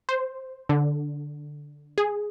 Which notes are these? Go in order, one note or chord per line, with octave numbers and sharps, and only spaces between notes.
C5
D3
G#4